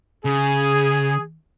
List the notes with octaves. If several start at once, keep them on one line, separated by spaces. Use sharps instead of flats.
C#3 G#4